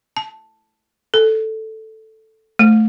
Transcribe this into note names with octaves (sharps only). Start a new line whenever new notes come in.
A5
A4
A3